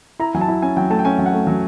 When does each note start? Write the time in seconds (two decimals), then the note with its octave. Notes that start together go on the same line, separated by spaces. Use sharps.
0.19 E4 A#5
0.35 F#3 G#5
0.41 A5
0.48 E4
0.62 C#4 G#5
0.76 F#3 G5
0.90 A3 A5
0.99 G5
1.05 C#4 G#5
1.18 F#3
1.26 F#5
1.33 A3
1.47 F#3